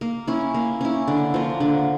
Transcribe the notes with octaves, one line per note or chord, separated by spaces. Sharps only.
A#3
C#4 E4
A#3
C#4 E4
D3
F3 A#3
D3